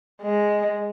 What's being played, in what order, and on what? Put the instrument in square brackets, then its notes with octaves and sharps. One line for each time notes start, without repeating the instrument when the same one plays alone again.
[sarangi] G#3